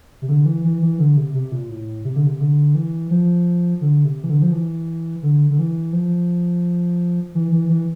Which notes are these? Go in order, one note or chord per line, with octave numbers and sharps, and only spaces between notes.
C3
D3
E3
E3
E3
D3
C3
C3
A#2
A2
C3
D3
C3
D3
E3
F3
D3
C3
E3
D3
F3
E3
D3
D3
E3
F3
E3
E3
E3